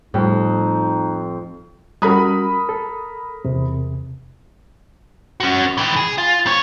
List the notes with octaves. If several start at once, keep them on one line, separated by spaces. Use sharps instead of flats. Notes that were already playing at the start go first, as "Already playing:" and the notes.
F2 A2 G3 D#4
G3 C#4 F#4 A#4 B5 D#6
A4
E2 C3
C#4 F#4
D#3 E3
G#4
F4
C4 C#5